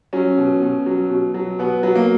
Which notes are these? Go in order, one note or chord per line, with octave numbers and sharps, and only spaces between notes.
F#3 C#4
B2
B2
F#3
B2
F#3
B2 B3
F#3 B3
A#3